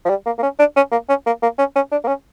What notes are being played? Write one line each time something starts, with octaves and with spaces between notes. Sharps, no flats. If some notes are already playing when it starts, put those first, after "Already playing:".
F3
G3
A#3
A#3
C#4
D4
C#4
A#3
C#4
A#3
A#3
C#4
C#4
D4
A#3
C#4